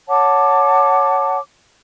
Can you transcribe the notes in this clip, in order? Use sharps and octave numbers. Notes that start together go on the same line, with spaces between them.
C#5 F#5 A5 D6